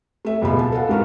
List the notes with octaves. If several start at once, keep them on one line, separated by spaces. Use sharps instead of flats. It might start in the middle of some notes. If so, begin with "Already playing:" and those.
A3 E5
C#2 B2 G#3 B4 B5
A5
A4 A#4 F5 F#5
G#2 F#4 A#4 B4 C#6 F6